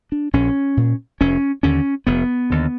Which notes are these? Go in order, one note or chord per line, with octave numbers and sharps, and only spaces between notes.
D4
A#1 C#4
A#2
F1 C#4
D#2 D3 C#4
F1 B3
D#2 D3